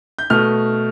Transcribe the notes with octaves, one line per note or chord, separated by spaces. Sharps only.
G6
B2 A3 F6